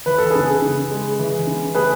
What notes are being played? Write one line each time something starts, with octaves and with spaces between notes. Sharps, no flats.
E3 B4
A4
C#3 G#4 B4
C#3
G#3
E3
C#3
A3 G#4 B4